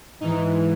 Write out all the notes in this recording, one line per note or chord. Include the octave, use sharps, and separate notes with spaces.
G#2 E3 D#4